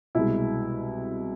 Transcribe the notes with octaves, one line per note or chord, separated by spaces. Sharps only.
C2 B2 G#3 E4